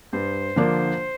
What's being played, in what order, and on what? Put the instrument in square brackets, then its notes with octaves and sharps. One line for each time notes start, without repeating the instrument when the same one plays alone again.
[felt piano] G2 [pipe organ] C5
[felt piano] D3 F3 A#3 D4